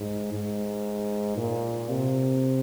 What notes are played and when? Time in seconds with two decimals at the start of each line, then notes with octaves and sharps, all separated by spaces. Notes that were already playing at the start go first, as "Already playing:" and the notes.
Already playing: G#2
0.33 G#2
1.37 A#2
1.89 C3